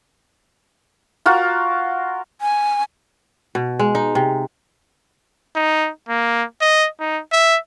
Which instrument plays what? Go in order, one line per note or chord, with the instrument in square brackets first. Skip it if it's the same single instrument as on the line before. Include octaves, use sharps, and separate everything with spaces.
[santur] F4 F#4 A#4
[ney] G#5
[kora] B2
G#3
D#4
C3
[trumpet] D#4
A#3
D#5
D#4
E5